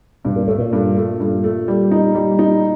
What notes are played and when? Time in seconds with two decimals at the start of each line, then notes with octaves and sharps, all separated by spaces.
0.25 G2 B2
0.36 A#2
0.47 A2 A3
0.58 A#2
0.73 G2
0.97 A3
1.20 G2
1.44 A3
1.68 G3
1.91 D#4
2.15 G3
2.39 D#4